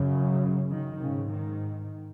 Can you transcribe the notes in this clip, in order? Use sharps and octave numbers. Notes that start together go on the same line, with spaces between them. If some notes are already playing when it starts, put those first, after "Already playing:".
Already playing: F#2 C#3
D#3
G#2 C#3
D#3